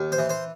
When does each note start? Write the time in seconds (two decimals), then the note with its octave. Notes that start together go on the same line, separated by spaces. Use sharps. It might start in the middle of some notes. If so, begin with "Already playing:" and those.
Already playing: D#2
0.12 C5
0.18 E3
0.29 C5